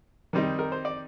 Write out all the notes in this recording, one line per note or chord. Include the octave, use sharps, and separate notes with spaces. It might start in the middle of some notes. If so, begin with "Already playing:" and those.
D#3 G3 C4 D#4
A#4
C5
D5